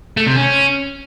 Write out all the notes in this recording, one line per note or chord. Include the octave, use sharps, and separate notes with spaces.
A3
C3
C#4